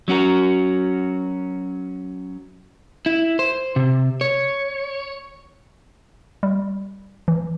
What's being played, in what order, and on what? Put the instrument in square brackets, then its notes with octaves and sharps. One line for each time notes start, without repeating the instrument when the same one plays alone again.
[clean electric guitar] F#3 C#4 F#4 A#4
[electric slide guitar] E4
C5
C3
C#5
[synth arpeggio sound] G3
E3